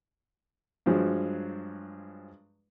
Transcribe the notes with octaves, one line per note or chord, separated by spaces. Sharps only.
G2 F3 F#3 G#3